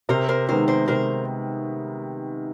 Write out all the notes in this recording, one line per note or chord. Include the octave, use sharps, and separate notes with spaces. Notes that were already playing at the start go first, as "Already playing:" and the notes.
C3 A#4 C5
A#4 C5
D#3 G#3 B3 A#4 C5
A#4 C5
C3 A#4 C5